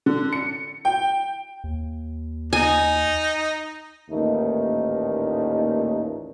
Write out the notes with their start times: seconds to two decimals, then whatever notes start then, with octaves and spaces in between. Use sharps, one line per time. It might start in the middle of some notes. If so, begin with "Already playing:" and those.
0.06 D3
0.33 C#7
0.85 G5
1.64 D#2
2.53 D#4 G#5
4.10 A1 D#2 A#2 A3 D#4